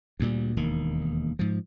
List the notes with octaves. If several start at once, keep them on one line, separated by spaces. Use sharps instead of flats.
D2 A#2 G3
E1 D#2 D#3 A#3
G#2 F3